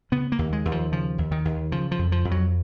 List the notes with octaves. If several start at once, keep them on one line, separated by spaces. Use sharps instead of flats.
C#3 B3
A#3
D#2
G#3
D#2
F3
C#3 F3
D#2
D#3
D#2
C#3 F3
F3
F2
F3
F2
F#3